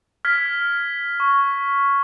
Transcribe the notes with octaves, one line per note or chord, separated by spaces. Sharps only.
F6 G#6 B6
C#6